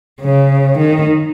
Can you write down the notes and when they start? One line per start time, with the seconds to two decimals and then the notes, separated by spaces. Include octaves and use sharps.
0.21 C#3
0.78 D#3